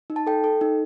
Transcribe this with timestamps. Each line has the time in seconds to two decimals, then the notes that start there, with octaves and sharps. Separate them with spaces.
0.10 D#4
0.16 A5
0.27 A4 G5
0.44 A4
0.61 D#4